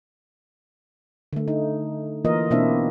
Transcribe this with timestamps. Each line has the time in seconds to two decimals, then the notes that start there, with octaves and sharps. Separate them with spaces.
1.33 D3 A3
1.48 D#4
2.25 E3 A#3 F4 A#4 D#5
2.51 B2 A#3 C4 D4 E4 E5